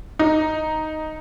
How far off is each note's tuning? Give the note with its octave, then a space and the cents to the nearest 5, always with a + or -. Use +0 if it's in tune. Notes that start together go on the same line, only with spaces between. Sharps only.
D#4 +0